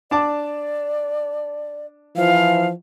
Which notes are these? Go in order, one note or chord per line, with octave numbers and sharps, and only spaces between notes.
D4 D5 A5 D6
E3 F3 F5